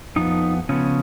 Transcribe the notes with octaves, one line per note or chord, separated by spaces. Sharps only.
F2 F3 B3 D#4
C#3 F3 B3 C#4